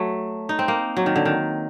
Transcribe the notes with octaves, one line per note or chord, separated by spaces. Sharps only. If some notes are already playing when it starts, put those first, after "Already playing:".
Already playing: F#3 A3
D#4
C4
A#3
F#3
D#3
D3
D#3